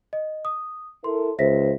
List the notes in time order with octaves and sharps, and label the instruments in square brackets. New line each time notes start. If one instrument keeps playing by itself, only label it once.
[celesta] D#5
D#6
[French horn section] E4 A4 A#4 [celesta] C6
[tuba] C#2 [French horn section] C5 [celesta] E5 A#6 B6